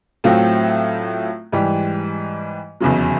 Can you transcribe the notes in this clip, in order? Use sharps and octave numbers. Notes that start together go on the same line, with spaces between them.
A2 F#3 A3 C4 F4
G#2 E3 G3
F1 E2 C#3 F#3